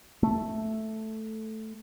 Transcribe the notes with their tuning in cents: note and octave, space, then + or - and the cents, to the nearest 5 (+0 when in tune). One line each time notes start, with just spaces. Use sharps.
A3 -5